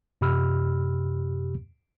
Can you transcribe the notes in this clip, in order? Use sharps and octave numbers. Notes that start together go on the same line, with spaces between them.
F#2 C3 G4 B5 E6 F6